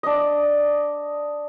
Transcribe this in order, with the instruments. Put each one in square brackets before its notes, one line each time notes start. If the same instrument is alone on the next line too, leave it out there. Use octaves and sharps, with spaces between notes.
[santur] D4 D#5